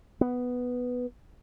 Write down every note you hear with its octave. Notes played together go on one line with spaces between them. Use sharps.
B3